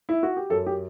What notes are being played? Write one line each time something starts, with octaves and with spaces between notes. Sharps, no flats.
E4
F#4
G4
F#2 A4
G4